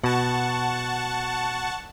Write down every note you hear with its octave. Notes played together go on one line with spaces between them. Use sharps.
B2 F#5 A5 C#6